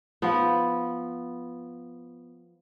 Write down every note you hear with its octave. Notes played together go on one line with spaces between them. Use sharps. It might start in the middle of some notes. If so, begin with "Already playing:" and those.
F3 B3